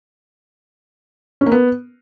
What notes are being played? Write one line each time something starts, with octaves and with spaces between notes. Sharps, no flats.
C#4
A#3
B3